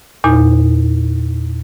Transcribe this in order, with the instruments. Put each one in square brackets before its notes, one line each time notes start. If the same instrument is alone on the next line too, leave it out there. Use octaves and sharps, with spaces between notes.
[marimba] E2 A#2 D#4